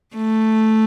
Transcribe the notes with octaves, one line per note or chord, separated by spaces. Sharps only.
A3